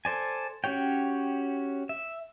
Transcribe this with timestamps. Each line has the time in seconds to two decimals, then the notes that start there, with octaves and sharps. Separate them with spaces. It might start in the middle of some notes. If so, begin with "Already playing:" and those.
0.05 A4 C5 D5 G#5
0.64 C#4 F#4 G4 C#5 G5
1.89 E5